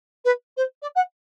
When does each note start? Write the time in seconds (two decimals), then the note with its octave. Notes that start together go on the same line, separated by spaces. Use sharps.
0.25 B4
0.57 C5
0.82 D5
0.95 F#5